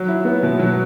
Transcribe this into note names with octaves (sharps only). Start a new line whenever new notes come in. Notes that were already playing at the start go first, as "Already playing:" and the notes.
Already playing: F#3
E4
B3
B2
F#3